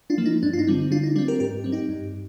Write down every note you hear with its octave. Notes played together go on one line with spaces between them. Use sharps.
D4 F4
F3 A#3
D#4
G2 D4
F4
D#4
D3 G3 C4
D3 D4 F4
D#4
G3 C4 D4 F4
G4 A#4
G#2 G4 A#4
G3 C4
D#4 G4
G2